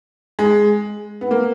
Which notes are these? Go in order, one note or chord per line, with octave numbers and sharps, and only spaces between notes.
G#3
B3
A#3